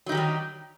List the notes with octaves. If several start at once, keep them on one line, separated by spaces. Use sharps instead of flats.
D#3 F#3 G3 D#4 G4